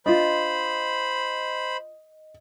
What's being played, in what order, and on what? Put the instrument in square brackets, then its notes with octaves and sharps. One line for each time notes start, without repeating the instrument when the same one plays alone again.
[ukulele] D4 F4 [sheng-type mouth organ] C5 B5 [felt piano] D#5